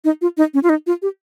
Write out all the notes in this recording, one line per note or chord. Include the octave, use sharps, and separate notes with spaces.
D#4
F4
D#4
C#4
F4
D#4
F4
G4